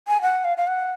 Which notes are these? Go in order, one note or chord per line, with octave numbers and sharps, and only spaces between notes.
G#5
F#5
F5
F5
F#5